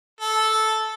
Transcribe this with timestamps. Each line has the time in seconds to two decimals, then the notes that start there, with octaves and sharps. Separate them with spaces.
0.21 A4